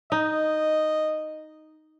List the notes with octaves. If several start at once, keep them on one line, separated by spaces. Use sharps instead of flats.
D#4 D#5